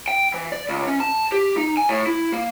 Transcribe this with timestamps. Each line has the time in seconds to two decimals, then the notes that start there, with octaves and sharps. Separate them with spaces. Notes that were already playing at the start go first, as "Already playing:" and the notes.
0.08 G5
0.34 E3
0.52 D5
0.69 C#2
0.87 C#4
1.00 A5
1.32 G4
1.57 D#4
1.77 G#5
1.89 A2
2.07 E4
2.33 A#3